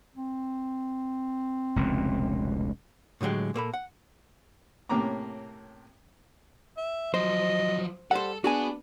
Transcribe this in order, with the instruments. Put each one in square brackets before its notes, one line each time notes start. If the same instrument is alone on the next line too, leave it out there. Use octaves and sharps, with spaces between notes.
[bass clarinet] C4
[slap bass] F1 C#2 B2
[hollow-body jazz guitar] A2 D3 F#3 G#3 G4
A#2 A#3 A4 B5
F#5
[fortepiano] A2 C3 A#3 C#4 A#5 D6
[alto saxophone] E5
[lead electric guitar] F3 F#3 [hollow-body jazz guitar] C5 [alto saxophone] D#5
[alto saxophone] G3 [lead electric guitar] A4 [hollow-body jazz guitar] C5 F#5
[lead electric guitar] B3 [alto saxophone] D4 [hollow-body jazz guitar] F#4 G#4 G#5